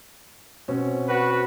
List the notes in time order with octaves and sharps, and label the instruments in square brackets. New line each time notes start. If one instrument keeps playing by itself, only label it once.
[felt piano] B2 C4 C#4
[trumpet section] F#4 B4